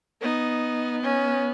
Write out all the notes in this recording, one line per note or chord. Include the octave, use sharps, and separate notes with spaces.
B3 D#4
C#4